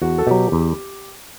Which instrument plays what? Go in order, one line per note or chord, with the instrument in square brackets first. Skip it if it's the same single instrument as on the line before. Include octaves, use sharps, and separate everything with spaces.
[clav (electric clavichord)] E2 [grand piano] F#4
[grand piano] A4
[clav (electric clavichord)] B2 F#3 [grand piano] G4
[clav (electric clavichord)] E2